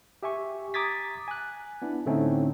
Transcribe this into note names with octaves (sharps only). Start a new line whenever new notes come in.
G4 E5 G#5 C#6
A#5 D6 D#6 G#6 A6 B6
G#5 F#6
B3 D4 E4
A2 D3 A3 C4 C#4 D#4